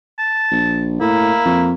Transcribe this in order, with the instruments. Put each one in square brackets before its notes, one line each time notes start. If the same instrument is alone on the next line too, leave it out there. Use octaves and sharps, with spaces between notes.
[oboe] A5
[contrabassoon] A#1
[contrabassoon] A2 [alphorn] A#3 [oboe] E4
[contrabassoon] F2